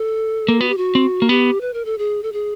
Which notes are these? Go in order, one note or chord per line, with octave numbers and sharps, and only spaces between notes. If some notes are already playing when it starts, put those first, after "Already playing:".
Already playing: A4
A#3
B3 F#4
G4
F#4
C4
A#3
B3 G4
B4
A#4
A4
G#4
A4
G#4